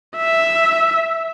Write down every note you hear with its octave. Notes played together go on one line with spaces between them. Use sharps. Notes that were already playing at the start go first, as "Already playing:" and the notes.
E5